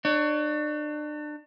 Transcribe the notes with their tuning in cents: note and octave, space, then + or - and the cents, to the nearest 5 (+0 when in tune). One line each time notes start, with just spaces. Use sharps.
D4 +35 C#5 +15